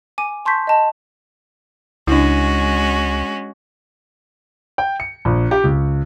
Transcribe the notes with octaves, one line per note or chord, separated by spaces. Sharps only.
G#5 D6 D#7
A5 C6 C#6 G6 B6
D#5 A5
C#2 G#3 C#4 D4 E4 F#4
G5
C#7
A#1
G4
C#2